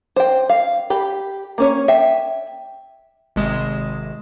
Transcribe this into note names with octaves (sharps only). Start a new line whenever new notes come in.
C5 G5
F5
G4 B5
A#3 C#4 C#5
E5 G5
G#1 C3 G#3 D#6 E7